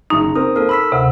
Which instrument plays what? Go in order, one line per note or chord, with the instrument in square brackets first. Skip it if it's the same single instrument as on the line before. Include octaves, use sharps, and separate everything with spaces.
[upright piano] F#1 C#6 [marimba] D#4 [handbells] A#5
[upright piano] C4 A#4 [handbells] D#6
[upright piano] A#3 C5 [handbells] A4 A#4
[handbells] B5 E6 B6 [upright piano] C6
[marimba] D2 C3 [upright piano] E5